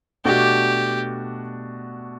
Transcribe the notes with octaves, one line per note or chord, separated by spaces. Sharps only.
B2 A3 D4 F#4 G4